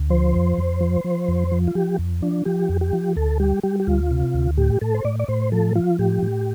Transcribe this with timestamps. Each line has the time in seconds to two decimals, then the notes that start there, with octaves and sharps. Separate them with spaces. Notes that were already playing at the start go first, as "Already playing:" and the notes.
Already playing: D2
0.10 F3 C5
0.34 F2
0.58 F2
0.81 F3
1.04 F3
1.28 F2
1.52 F3
1.67 F4
1.75 F3 G4
1.99 F2
2.22 F3 D4
2.45 F3 G4
2.69 F2
2.81 G4
2.93 F3
3.16 D2 A4
3.40 G3 G4
3.63 G3 G4
3.80 G4
3.87 D2 F4
4.11 C3
4.34 D2
4.57 A2 G4
4.81 A2 A4
4.95 C5
5.04 A2 D5
5.19 D5
5.28 A2 C5
5.52 F3 A4
5.75 F3 F4
5.99 A2 G4
6.23 A2